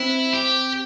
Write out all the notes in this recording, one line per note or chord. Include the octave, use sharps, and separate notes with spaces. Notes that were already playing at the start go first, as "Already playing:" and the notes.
Already playing: C4 E4
G4